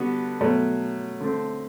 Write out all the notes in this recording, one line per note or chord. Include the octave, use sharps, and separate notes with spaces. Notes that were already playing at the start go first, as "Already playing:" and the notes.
Already playing: D3 G3 B3 F#4 A4
B2 F#3 A3
D3 A3 C4